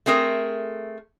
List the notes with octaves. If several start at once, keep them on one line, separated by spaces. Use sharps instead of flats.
A3 C4 G#4 A#4